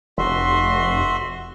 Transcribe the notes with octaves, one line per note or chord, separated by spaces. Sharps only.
F1 F#4 E5 C6